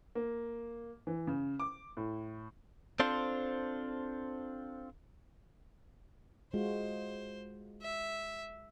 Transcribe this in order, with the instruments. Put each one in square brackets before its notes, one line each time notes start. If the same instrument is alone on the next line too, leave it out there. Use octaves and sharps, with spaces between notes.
[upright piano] A#3
E3
C#3
D6
A2
[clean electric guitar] C4 D4 F4 A4 C5
[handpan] G#3 F4 F#4 [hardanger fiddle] C5
[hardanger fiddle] E5